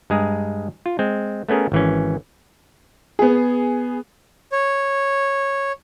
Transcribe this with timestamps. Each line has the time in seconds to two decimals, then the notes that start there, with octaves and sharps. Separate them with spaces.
0.10 G2 G#3 G#4 A#5
0.86 F4
0.99 G#3 C4
1.49 A3 B3 C#4 G#4 A#4
1.72 G#1 E3 C#4
3.19 B3 G#4
4.52 C#5